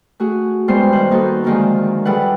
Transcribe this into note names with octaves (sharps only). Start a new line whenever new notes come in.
A3 F#4 G#4
F#2 G3 G#3 B3 C5 C6
G2 D#3 C5 F#6
A#3 B3 D#4 F#4 A4 C5
F#2 A#2 D3 D#3 F3 G#3
G3 E4 G#4 A4 B4 F#5